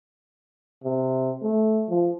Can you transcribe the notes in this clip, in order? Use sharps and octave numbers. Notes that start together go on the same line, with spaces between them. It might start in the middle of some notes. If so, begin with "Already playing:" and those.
C3
A3
F3